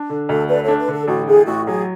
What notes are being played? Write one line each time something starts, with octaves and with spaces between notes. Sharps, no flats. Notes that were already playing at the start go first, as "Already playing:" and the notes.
Already playing: D4
D3
D2 A4
A3 B4 D5
D4 A4 C#5
B4
D3
A4
A1 F#4
A2 G#4
A1 F#4
F#3 G#4